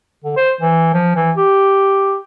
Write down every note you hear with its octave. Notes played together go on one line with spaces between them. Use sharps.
D3
C5
E3
F3
E3
G4